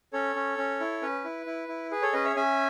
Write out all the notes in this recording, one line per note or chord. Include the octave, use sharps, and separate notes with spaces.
C#4 A4 C#5
C#4
C#4
E4
C#4 B4
E4
E4
E4
G#4 B4
A4 C#5
C#4 B4 D#5
C#5 E5
C#4 E5 G#5